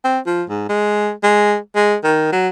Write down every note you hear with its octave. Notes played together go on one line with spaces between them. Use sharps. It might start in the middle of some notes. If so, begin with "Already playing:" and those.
C4
F3
G#2
G#3
G#3
G#3
D#3
F#3